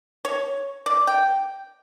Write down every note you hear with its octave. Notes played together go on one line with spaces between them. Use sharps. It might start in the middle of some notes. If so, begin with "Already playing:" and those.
C#5
D5
G5